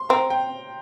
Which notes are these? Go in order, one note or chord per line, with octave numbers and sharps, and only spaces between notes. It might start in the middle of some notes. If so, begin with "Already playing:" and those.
Already playing: C6
C4 A#5
G5